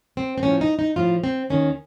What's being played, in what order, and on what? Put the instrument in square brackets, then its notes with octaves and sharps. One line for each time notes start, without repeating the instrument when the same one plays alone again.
[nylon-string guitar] C4
C4
A2 F3 C#4
D#4
D#4
A2 F3 F4
C4
D#2 D#3 C#4